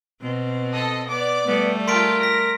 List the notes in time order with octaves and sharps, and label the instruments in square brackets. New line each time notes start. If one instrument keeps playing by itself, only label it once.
[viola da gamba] B2 C4
[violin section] A4 D#5
[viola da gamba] B3 [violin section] D5 D6
[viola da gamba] G3 A3 [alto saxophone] B3
[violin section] F4 G5 A5 [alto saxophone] A#4 [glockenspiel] C6 B6 D7
[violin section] A#6 [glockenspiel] B6